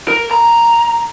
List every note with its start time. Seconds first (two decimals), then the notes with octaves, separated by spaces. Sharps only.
0.08 A#4
0.31 A#5